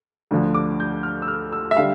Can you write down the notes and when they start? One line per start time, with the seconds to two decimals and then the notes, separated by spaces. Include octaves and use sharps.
0.31 D2 D3 F3
0.54 D6
0.80 G6
1.03 F6
1.22 E6
1.28 F6
1.53 E6
1.71 E5
1.77 D3 G3 F5